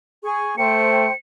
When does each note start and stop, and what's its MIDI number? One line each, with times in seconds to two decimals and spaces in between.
0.23 0.55 68
0.23 0.55 85
0.58 1.09 57
0.58 1.11 72
0.58 1.11 79
0.58 1.16 97